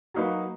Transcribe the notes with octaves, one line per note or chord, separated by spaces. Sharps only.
F#3 A#3 D#4 F#4 B4